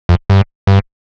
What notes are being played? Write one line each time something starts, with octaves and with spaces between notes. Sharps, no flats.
F2
G2
G2